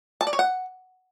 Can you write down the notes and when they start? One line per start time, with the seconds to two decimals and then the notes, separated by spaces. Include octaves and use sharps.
0.21 A5
0.27 D5
0.33 C#5
0.39 F#5